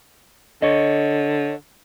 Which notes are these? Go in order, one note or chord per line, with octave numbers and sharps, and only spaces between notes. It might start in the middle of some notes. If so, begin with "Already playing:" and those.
D3 C#5 D#5